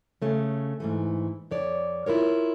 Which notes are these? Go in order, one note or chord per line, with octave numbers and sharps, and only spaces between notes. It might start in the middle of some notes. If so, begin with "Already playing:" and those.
C#3 A3 C#4
G#2 E3 A3
F2 C#5 D5
E4 F4 A#4 C#5